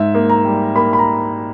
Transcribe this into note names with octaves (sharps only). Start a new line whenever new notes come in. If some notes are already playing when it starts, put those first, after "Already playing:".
Already playing: G#2 E5
A#3
A#5
G3
A#3 B5
B5
A#5